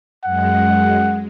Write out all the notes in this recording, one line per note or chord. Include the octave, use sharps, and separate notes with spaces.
F#2 G#3 F#5